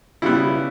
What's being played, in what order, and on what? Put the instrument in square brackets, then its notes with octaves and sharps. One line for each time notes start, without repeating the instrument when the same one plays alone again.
[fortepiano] C#3 G3 B3 E4